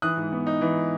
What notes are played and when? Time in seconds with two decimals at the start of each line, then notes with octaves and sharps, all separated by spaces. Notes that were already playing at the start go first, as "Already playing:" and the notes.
0.02 E3 D#6 F#6
0.17 G#2
0.32 B3
0.47 D#4
0.61 E3